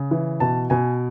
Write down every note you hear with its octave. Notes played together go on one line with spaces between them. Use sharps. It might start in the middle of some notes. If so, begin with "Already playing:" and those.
Already playing: C#3
E3
B2 A5
B2 G#5